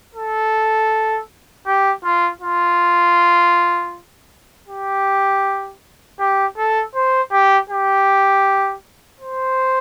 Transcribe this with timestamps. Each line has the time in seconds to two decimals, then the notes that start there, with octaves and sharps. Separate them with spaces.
0.15 A4
1.66 G4
2.04 F4
2.41 F4
4.68 G4
6.20 G4
6.57 A4
6.95 C5
7.32 G4
7.69 G4
9.20 C5